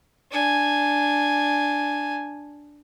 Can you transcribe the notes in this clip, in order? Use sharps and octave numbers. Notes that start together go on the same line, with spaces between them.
D4 G#5